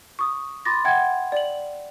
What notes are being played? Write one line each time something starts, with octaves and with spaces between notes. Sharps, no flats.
C#6 D#6
B5 C6 D6 A6 A#6
E5 F#5 G5 G#6
D5 F#7